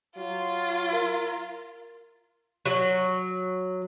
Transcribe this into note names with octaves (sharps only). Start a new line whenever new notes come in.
F#3 F4
A#4
F#3